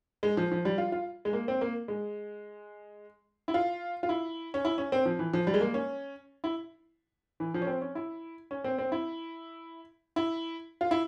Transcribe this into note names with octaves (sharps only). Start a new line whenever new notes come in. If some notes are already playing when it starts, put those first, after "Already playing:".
G#3
F3
F3
G3
F4
F4
G#3
A#3
C4
A#3
G#3
E4
F4
F4
E4
C#4
E4
C#4
C4
F3
E3
F3
G3
G#3
A#3
C#4
E4
E3
F3
C#4
C4
C#4
E4
C#4
C4
C4
E4
E4
F4
E4